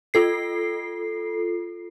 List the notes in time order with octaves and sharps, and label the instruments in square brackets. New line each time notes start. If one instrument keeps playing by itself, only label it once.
[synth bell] F4 A4 C7